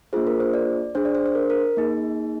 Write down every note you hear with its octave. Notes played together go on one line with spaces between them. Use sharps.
A#3 D4 F4 G#4 C5
A#4
C5
D5
D4 G#4 C5
D5
C5
C5
A#4
A#4
A#3 D#4 G#4